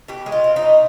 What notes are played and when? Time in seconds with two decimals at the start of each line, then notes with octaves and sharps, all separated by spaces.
0.08 B2 G4
0.26 G#3
0.32 F4
0.44 C4
0.56 D#4
0.62 B2